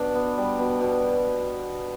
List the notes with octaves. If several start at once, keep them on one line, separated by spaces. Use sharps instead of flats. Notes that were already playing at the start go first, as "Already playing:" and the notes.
Already playing: B2 D4
B3
G3
B2
B2